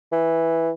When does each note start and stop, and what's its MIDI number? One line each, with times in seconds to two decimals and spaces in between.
0.12 0.70 52